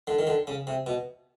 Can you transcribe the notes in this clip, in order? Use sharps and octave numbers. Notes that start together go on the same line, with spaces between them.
D3
D#3
D3
C#3
C3
B2